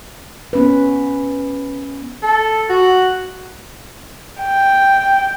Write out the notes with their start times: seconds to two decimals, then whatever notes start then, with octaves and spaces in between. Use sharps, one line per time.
0.53 B3 C#4 B4
2.23 A4
2.70 F#4
4.42 G5